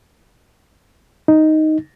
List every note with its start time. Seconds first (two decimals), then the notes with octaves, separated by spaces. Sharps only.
1.28 D#4